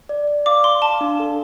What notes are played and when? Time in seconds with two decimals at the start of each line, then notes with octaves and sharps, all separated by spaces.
0.09 D5
0.27 D5
0.46 F5 D6
0.64 F5 C6
0.82 F5 A5
1.01 D4
1.20 A4